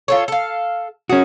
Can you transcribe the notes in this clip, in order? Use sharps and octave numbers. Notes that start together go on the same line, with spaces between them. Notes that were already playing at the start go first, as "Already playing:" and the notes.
F4 A4 C#5
A4 F5
C#4 F#4 G#4